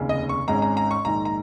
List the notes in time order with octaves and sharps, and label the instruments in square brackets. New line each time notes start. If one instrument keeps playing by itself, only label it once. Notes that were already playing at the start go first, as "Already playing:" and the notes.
Already playing: [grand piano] F1 D#2 C#3
D#5
C#6
G#1 G#2 G#3 C#4 A#5
A#5
A#5
C#6
A#1 G#2 D#3 A#5
A#5